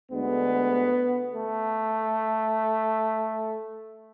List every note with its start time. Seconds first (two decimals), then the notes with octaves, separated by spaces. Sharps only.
0.10 D2 D3 G#3 B3
1.34 A3